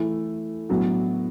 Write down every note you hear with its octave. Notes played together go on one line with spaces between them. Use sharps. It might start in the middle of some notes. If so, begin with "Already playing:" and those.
Already playing: E3 A3 E4
A2 F#3 B3 D4 F#4